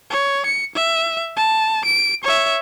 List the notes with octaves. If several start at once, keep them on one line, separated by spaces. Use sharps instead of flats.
C#5
C#7
E5
A5
D7
C#5 E5